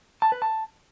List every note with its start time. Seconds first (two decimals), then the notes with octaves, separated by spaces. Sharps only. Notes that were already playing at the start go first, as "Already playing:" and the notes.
0.22 A5
0.32 B4
0.42 A5